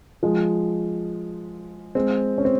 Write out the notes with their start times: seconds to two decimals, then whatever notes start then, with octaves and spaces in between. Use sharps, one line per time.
0.23 F3 G#3
1.95 G#3 C4
2.38 C#4
2.45 C4